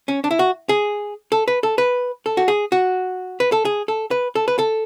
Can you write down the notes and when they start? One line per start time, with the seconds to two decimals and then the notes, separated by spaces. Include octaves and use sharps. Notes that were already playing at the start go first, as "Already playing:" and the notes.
0.08 C#4
0.24 D4
0.31 E4
0.39 F#4
0.69 G#4
1.32 A4
1.48 B4
1.63 A4
1.78 B4
2.26 A4
2.37 F#4
2.48 G#4
2.72 F#4
3.40 B4
3.52 A4
3.65 G#4
3.88 A4
4.11 B4
4.35 A4
4.48 B4
4.59 A4